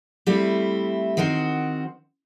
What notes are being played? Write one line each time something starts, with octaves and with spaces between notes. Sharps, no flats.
G3 A3 C4 E4
D#3 C4 F#4 C5